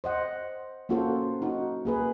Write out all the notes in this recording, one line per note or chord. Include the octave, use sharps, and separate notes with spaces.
C5 D#5 F#5
A#3 C#4 F4 F#4 A4 C5
D#4 F#4
A#3 G#4 B4